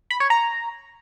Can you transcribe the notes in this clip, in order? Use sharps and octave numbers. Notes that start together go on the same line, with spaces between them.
B5
C#5
A#5